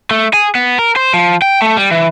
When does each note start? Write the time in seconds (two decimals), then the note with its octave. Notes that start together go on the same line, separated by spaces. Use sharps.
0.11 A3
0.34 G#4
0.55 B3
0.79 A#4
0.96 C5
1.14 F3
1.42 G5
1.62 A3
1.77 G3
1.91 E3